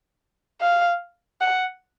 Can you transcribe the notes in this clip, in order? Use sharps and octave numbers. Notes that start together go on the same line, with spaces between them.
F5
F#5